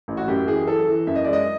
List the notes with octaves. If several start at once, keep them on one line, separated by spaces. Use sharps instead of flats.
A1
F#4
F#2 G4
E3 G#4
E3 A4
E3
F#2 E5
D#5
G#3 D5
D#5